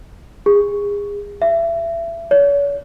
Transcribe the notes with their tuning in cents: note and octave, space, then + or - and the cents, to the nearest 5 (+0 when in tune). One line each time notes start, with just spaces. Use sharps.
G#4 -30
E5 +25
C#5 +40